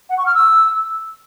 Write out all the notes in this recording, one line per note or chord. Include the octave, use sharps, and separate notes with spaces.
F#5
C#6
F6
E6